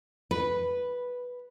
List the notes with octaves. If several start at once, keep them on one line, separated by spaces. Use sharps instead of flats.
B4